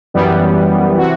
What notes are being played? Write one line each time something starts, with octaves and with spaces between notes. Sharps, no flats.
F#2 E3 G3 B3
C3 E3 F#4